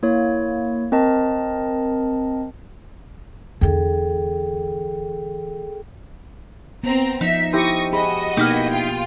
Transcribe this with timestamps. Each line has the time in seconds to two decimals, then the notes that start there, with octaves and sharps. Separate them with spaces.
0.03 A#3 E4 C#5
0.92 C4 A#4 D#5 A5
3.61 E2 D3 G#4 A4 G5
6.84 B3 C4 A#5
7.21 F3 D#4 E5 B6
7.53 E4 G4 C5 C#6 D#6 A#6
7.93 F#4 G#4 D#5 B5
8.37 B2 A#3 B3 D#4 E4 G4 F6
8.71 F4 G5